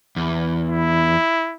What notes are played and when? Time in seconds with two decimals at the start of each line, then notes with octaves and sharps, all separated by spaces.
0.16 E2
0.69 E4